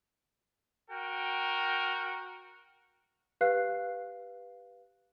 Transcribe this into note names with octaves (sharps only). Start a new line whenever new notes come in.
F#4 A#4 G5
G4 B4 F5 F#6 C7